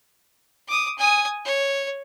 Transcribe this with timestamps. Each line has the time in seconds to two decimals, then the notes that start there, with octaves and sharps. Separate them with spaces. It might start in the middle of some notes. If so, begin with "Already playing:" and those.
0.68 D6 D#6
0.98 G#5 D#6
1.45 C#5